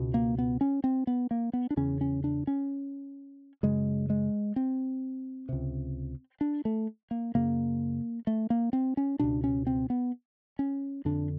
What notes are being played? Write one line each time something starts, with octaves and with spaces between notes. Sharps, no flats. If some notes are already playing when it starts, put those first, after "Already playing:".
Already playing: C#2 B2
A#3
B3
C#4
C4
B3
A#3
B3
D4
E2 C#3 C#4
C#4
D4
C#4
F#2 C#3 G#3
G#3
C4
C#2 C3
D4
A3
A#3
F#2 C#3 A#3
A3
A#3
C4
C#4
C#2 B2 D4
C#4
C4
B3
C#4
F2 D3 D4